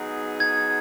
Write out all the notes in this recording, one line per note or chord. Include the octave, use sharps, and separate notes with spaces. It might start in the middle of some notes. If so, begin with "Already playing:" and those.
Already playing: F#3 B3 D#4 G#4
G#6